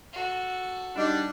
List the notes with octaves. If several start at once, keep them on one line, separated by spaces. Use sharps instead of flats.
F#4 A4
G3 D4 D#4 D#5